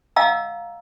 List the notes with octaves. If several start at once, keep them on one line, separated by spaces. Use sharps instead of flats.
D#5 F5 F#5 A#5 E6